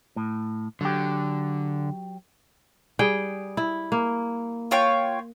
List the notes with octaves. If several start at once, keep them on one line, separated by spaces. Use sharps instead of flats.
A2
D3 F#3 G4
G3 G#4 G5
E4
A#3
F4 C#5 G5